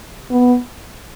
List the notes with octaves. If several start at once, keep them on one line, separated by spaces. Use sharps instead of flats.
B3